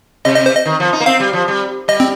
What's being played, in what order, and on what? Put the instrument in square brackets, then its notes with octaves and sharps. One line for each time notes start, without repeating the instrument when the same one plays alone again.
[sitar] C3 [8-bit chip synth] D#5
[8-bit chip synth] D#5
C5
D#5
[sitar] D#3
F3
D#4
A#3
[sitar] C4 [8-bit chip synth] F5
[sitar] G3
F3
G3
[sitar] G3 [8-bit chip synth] D#5
[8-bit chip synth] C4